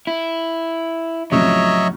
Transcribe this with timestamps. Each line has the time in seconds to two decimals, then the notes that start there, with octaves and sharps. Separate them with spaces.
0.07 E4
1.32 F2 A2 C#3 F#3 C#5 D#5 E5